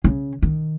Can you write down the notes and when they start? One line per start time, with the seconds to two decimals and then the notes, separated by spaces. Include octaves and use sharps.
0.04 C#3
0.42 D#3